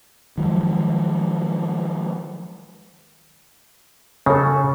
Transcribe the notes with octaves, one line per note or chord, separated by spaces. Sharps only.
D#3 F3 F#3 G#3
C#3 C#4 A4